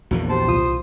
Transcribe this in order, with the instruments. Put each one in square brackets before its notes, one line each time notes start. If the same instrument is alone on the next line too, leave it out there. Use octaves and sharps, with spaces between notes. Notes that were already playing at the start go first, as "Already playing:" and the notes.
[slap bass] A#1 E2 E3 [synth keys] A#3 F#4
[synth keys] G4 A5 [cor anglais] C5
[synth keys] C2 F4 D#6